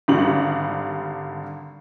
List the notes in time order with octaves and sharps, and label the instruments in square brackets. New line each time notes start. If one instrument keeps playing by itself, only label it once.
[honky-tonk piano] G#1 D3 G3 F#7